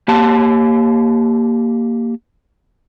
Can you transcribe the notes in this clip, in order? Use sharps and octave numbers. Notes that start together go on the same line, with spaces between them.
A#3 G4 A5